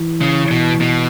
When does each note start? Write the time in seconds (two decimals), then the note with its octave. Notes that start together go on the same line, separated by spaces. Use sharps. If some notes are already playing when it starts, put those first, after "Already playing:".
Already playing: E3
0.21 C#3
0.51 B2
0.81 B2